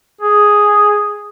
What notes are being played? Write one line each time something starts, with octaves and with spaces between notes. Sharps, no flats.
G#4